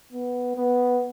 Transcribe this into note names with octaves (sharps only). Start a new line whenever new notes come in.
B3
B3